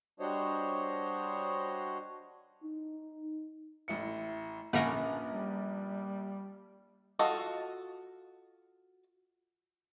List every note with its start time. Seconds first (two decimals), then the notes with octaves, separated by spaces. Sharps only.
0.20 G3 D4 F#4 C5 C#5 D#5
2.64 D#4
3.88 A1 E4 C#7
4.73 A#1 A#3 C#4 A#4 B4 F5
5.32 G3
7.19 F4 F#4 A4 D#5